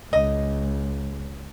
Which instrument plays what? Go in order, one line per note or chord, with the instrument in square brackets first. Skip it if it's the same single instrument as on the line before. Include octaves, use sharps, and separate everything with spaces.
[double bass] C#2 [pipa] D#5